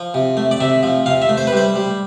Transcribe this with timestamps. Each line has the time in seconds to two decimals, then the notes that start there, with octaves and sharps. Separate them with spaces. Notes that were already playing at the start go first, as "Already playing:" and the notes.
Already playing: F3
0.14 C3
0.37 A3
0.51 D5
0.61 C3 E5
0.83 F3
1.06 C3 F5
1.22 E5
1.29 A3
1.38 C5
1.47 B4
1.53 G3 C5
1.76 G3